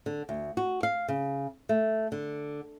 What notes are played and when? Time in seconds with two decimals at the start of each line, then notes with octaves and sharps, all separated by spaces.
0.06 D3
0.29 D2
0.57 F#4
0.83 F5
1.08 C#3
1.69 A3
2.12 D3